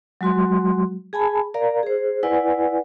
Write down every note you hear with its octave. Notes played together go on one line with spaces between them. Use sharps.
F#3 G#3 F#4 C6
G#4 G#5 A5 B5
A#4 D5 F5 A#5
G#4 C5
E4 B4 D5 F#5 G#5